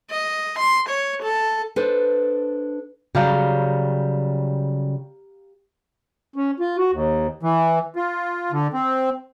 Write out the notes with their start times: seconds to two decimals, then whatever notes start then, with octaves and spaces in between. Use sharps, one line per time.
0.11 D#5
0.59 C6
0.89 C#5
1.22 A4
1.76 D4 A4 B4 C5
3.15 C#3 F#3 G3 G4 F5 A#5
6.36 C#4
6.60 F4
6.77 F#4
6.92 D#2
7.43 E3
7.96 F4
8.52 D3
8.74 C4